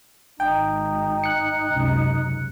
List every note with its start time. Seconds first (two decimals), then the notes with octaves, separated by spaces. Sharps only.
0.40 G#1 D#4 G5
1.24 F#6 C#7
1.70 C#2 F#2 C3